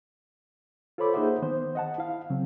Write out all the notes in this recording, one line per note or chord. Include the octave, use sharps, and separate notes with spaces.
F4 A4 C5 C#5 B5 D6
A#3 D#4 G#4 C5 E5 F#5
D#3 B3 C5
D#5 F#5 A5
E4 F5
C#3 F#3 C4